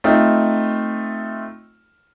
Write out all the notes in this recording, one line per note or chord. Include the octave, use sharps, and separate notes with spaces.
A3 C4 D#4 F4